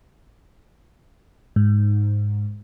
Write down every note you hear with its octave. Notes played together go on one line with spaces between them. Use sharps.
G#2